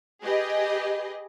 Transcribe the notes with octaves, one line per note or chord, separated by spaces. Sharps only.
G4 G#4 B4 D#5